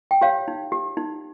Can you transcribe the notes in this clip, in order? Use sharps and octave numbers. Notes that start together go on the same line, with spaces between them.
G5
G4 C#5 F5
D#4
G4
D#4